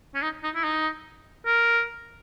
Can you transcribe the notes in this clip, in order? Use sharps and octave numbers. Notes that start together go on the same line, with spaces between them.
C#4
D#4
D#4
E4
D#4
A#4